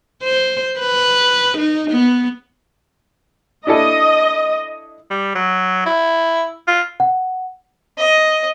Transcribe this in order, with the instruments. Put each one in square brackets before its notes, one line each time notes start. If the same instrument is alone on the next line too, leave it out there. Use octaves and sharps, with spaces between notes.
[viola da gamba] C5
B4
D#4
B3
[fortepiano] D4 E4 A4 [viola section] D#5
[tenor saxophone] G3
F#3
E4
F4
[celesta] F#5
[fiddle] D#5